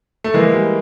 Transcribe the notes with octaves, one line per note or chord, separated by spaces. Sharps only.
A3
E3 G#3 A#3
G3